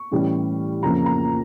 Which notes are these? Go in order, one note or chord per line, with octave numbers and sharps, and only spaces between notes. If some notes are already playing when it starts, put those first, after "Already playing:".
Already playing: C#6
A2 E3 G3 C#4
F2 C#3 F3 A#3 C#4 A#5
A#5